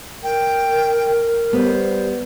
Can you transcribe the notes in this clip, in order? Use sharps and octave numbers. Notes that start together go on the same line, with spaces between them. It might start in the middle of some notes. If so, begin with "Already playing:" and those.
A#4 G5
G3 B3 C5